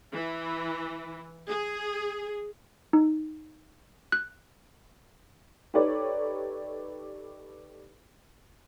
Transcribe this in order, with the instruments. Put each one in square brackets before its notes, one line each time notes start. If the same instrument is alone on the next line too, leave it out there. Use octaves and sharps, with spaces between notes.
[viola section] E3
G#4
[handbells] D#4
F#6
[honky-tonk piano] D#4 G4 A4 B4 C#5 D5